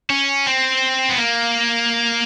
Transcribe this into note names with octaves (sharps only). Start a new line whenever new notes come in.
C#4
C4
B3
A#3